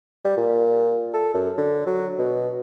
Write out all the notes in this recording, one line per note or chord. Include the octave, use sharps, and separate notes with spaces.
G3
A#2
A4
F#2
D3
F#3
B2